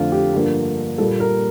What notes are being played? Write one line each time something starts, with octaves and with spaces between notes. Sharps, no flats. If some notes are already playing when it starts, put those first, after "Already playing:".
Already playing: F2 D3 A3 F4
G4
G2 D3 F3 A#3
A#2 G3 A#3 A4
A#4